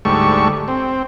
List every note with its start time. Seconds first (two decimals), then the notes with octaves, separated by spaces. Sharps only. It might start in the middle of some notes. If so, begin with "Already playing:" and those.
0.05 D2 G#2 G3 A4 C#6
0.68 C4